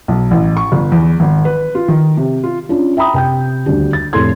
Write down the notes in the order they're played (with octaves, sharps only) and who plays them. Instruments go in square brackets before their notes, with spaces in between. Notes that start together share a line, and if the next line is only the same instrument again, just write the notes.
[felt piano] B1
A1
C#6
G1
E2
G#1
B4
F4
D#3
C3
F4
C#4 D4 F4
E5 G5 A#5 B5 D#6
C3 G5 G6
D#1 D2 D4 G4
A6
F1 A2 A4 C6 G#6